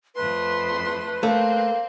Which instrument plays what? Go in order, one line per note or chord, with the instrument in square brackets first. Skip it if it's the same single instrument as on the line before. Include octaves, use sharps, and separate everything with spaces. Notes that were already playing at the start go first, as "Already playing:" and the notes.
[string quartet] F2 A3 C6 [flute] B4
[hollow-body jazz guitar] A3 [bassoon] A#3 [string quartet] C4